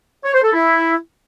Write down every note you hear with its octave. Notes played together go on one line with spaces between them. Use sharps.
C#5
C5
A4
E4